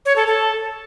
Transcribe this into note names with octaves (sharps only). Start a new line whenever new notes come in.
C#5
A4
A4